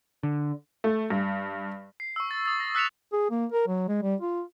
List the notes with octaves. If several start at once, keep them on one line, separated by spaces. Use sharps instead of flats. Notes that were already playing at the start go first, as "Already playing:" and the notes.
D3
A3
G2
C7
C#6 E6
A6
D#6 A6
A#6
E6 F#6 B6 C#7 E7 F7
G#4
A#3
A#4
F#3
G#3
G3
F4